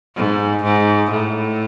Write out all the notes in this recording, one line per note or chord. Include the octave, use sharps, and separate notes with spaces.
G#2
G#2
A2